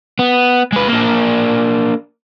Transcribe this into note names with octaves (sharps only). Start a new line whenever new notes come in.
B3
G#3 B4
A#3 D4